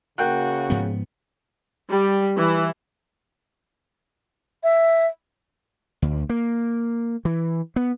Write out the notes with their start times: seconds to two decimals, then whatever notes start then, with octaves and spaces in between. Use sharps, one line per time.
0.18 C#3 A#3 F#4 G5 F#6
0.70 G#2 F3 B3
1.89 G3
2.37 E3
4.64 E5
6.02 D2
6.29 A#3
7.25 E3
7.76 B3